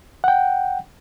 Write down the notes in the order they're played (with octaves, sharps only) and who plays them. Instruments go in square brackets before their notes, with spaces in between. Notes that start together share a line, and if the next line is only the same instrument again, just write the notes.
[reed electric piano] F#5 G5